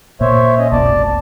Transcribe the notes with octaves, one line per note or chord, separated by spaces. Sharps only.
A#2 C5 C#5 E5
C#4 D#5
F1 B1 D5 A5